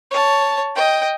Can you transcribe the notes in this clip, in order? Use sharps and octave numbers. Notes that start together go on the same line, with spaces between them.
C#5 A5
D#5 G5